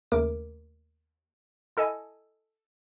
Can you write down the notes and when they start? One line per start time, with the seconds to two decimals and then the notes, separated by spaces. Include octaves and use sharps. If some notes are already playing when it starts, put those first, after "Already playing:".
0.12 D#2 C#3 A3 A#4 D6
1.77 E4 A4 D#5 G#5